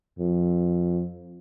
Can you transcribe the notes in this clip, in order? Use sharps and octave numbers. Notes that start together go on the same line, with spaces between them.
F2